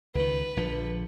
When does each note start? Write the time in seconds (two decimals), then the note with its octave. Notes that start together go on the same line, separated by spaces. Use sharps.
0.15 C#2 D#3 B4
0.57 A#1 D3 F3